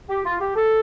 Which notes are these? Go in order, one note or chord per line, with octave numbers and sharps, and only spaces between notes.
G4
F4
G4
A4